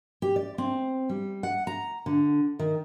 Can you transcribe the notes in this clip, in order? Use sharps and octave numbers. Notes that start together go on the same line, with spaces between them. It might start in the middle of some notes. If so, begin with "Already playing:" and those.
G4
D5
C4
G3
F#5
A#5
D3
D#3